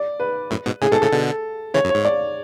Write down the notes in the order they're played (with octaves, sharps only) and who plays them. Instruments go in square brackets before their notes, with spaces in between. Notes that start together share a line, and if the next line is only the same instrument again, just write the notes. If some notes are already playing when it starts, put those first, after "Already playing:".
Already playing: [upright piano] D5
B4
[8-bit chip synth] F#2 A2
G#2 B2
[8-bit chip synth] A2 C#3 [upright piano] G#4
[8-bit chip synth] G#2 B2 [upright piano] A4
[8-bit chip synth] A2 C#3 [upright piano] A4
[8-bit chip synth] B2 D3
[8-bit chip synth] C#3 E3 [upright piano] C#5
[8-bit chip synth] F#2
[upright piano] C#5
[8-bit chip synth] G#2
[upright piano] D5